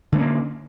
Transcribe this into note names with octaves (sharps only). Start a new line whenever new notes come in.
D3 A3 A#3 C#4